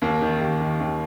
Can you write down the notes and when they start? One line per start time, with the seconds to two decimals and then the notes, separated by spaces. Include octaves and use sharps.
0.02 D#2 A#3
0.22 D#3
0.40 D#2 G4
0.60 D#3
0.80 D#2